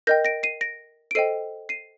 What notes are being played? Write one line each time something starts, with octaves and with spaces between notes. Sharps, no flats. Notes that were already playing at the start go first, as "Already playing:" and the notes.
A#4 D#5 G5 G6 A#6
A#6 D7
C7 D#7
A#6 D7
D7
A4 C5 D#5 G5 C7 D#7
C7 D#7